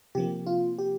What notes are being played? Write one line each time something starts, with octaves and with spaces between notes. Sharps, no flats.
C3 F3 A#3 G4
F4
G4